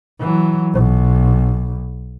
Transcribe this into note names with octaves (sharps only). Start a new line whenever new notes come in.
E3 F#3
B1